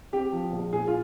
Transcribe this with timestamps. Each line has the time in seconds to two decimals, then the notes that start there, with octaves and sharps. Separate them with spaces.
0.13 C4 G4
0.32 F3
0.52 A#1
0.73 A#2 G#4
0.87 F4